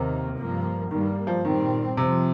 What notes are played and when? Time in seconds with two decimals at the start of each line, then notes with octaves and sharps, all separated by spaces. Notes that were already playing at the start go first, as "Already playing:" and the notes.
Already playing: D#2 C3 D#3 A#3
0.39 G2 F3 A#3
0.91 G2 D#3 G3 A#3
1.27 F3
1.44 A#2 D#3 G3 C4
1.97 F2 C3 F3 C4